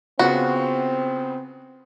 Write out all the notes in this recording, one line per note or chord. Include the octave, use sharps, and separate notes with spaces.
C#3 B3 C4 F4 F#4